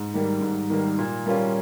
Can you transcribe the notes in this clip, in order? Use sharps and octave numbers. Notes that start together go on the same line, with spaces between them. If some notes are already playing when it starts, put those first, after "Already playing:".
Already playing: G#2
D#3 G3 A#3
G#2
D#3 G3 A#3
A#2
G3 A#3 C#4 F4